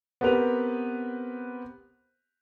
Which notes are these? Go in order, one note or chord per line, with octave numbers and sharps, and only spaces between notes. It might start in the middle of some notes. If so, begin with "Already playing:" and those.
B3 C4 G4 A#4 B4 F7